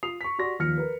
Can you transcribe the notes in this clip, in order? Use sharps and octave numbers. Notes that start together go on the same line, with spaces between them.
F4 D#6 C7 F7
C#6 B6
F#4 G4 D5 C6 C#6 A#6
D#2 F3 F6 A#6 C#7
A#4 B4